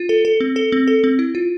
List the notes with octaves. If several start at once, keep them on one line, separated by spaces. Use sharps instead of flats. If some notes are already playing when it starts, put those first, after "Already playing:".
Already playing: F4
A4
A4
C4
A4
C4
A4
C4
E4
F4